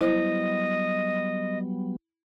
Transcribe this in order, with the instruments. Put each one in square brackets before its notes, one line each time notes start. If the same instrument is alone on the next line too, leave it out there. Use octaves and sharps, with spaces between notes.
[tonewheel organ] F#3 G3 B3 [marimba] E4 C5 [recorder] D#5